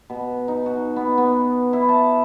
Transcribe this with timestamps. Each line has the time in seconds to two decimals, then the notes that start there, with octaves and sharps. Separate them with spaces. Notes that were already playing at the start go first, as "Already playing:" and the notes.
0.10 B2
0.48 D#4
0.66 F#4
0.96 B3
1.18 B3
1.73 E4
1.88 A5